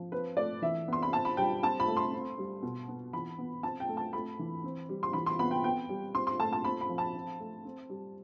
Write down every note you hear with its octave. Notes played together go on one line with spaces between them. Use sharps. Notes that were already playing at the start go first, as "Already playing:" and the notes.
Already playing: F3
C4 B4
A3 D5
E3 E5
B3 C6
B5
C4 A5
B5
G3 G5
C4 A5
B5
A3
C6
C4
G3
B2
B3
E3 B5
B3
C4 A5
G5
A3
A5
A3 B5
E3
C4
G3
C6
E3 B5
C6
B3 B5
G5
B3 G5
G3
C4 C6
C6
A3 A5
A5
C4 B5
B5
F3
A5
C4
A3
C4
G3